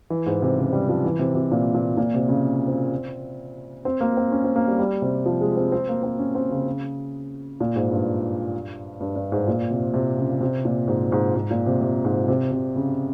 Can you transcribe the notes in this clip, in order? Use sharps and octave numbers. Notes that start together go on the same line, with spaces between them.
E3
G#2
C3
C#3
G3
F3
E3
C3
C3
A#2
A#2
A#2
C3
C#3
C4
C4
A#3
C4
C#4
C4
A#3
G3
G3
C3
F3
G#3
C4
C4
A#3
C4
C#4
C4
C#3
A#2
G#2
G2
G2
G2
G#2
A#2
C3
C3
C#3
C3
A#2
G#2
G#2
G#2
A#2
C3
C3
G#2
C3
C3
C#3